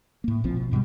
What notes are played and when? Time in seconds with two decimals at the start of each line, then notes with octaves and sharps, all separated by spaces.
0.24 A2 A#3
0.44 A#1 F3 C4
0.57 B2
0.71 G2 B2 F3 G3